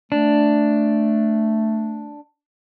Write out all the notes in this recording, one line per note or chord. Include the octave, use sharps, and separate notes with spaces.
A3 D4